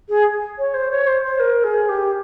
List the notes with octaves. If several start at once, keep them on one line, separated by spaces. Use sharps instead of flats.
G#4
C#5
C5
C#5
C5
C5
A#4
G#4
G4